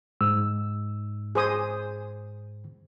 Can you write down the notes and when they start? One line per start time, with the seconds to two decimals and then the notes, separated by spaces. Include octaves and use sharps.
0.21 G#2 E6
1.35 G#4 C5 D#6